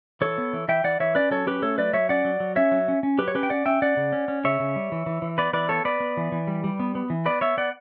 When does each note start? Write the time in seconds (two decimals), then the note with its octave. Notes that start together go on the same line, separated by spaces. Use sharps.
0.21 E3 A4 C#5
0.38 B3
0.53 E3
0.68 E3 E5 G5
0.84 E3 D5 F#5
1.00 E3 C#5 E5
1.15 C#4 B4 D5
1.31 F#3 A4 C#5
1.47 C#4 G4 B4
1.62 A3 A4 C#5
1.78 F#3 B4 D5
1.93 F#3 C#5 E5
2.09 C#4 D5 F#5
2.25 F#3
2.40 F#3
2.56 C#4 C#5 E5
2.72 F#3
2.88 C#4
3.03 C#4
3.19 F#3 G4 B4
3.28 C#5
3.35 C#4 G4 B4
3.43 G5
3.50 C#4 D5 F#5
3.66 C#4 E5 G5
3.82 C#4 D5 F#5
3.97 C#3
4.12 C#4
4.28 C#4
4.44 C#3 C#5 E5
4.60 C#3
4.76 G3
4.92 E3
5.06 E3
5.22 E3
5.38 B3 B4 D5
5.53 E3 B4 D5
5.69 B3 A4 C#5
5.85 B3 B4 D5
6.00 B3
6.17 E3
6.32 E3
6.47 G3
6.64 G3
6.80 B3
6.95 B3
7.10 E3
7.25 B3 B4 D5
7.41 B3 C#5 E5
7.57 B3 D5 F#5